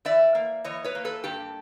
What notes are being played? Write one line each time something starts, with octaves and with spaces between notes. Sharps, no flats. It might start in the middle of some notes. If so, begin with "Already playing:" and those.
E3 D5 E5
A#3
E3 C#5 D#5
B4 C#5
A#3
A4 B4
G2 G4 A4